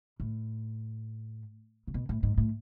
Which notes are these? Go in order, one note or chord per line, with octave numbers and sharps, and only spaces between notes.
A2
C#3
B2
A2
G#2
A2